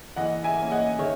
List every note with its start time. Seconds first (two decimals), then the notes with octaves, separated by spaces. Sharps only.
0.16 E3 D#5 F#5
0.43 E5 G#5
0.57 A#3 C#4
0.71 D#5 F#5
0.99 D#3 C#5 E5